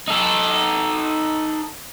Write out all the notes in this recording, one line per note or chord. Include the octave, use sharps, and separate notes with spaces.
D#4 A4